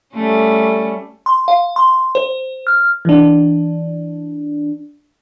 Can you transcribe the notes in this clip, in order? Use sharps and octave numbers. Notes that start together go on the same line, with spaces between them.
G3 A3 C#4
C6
F5
C6
C5
F6
E3 D4